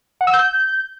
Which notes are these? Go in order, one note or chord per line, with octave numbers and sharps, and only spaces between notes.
F#5
E6
G6